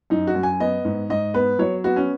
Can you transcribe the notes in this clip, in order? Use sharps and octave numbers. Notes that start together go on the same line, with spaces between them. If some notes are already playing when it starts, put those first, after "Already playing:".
F#2 D#4
F#4
F#2
G#5
B3 D#5
G#2
G#2 D#5
B3 B4
F#3 C#5
B3 F#4
C#4